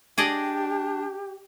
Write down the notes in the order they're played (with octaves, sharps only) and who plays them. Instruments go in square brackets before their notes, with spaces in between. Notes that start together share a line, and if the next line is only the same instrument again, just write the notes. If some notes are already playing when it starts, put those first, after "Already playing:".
[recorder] D4 [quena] G4 [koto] G#4 D5 D#5